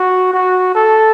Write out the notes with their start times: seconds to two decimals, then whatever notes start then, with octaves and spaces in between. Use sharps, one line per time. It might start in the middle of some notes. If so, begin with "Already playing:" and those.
Already playing: F#4
0.33 F#4
0.75 A4